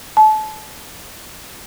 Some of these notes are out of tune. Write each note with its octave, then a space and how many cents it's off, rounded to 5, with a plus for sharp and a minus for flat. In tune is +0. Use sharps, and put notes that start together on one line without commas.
A5 -30